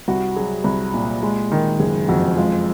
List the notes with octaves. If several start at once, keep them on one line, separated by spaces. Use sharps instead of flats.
C2 F#4
F#3 G#4
C2
A#2
G#3
D#3
F#1 G#4
F2 F#4
G#3 F4